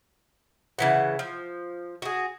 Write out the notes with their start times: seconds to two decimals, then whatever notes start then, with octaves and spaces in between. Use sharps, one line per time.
0.79 C#3 E3 F#5
1.19 F3
2.02 F#4 G#4